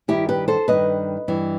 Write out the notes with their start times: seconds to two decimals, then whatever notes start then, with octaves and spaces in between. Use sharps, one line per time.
0.08 G2 D#3 E4 G4
0.29 G4 B4
0.48 A4 C5
0.68 G2 D#3 B4 D#5
1.28 G2 E3